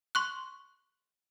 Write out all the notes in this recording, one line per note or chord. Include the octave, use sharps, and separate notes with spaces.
C6 C#6 F#6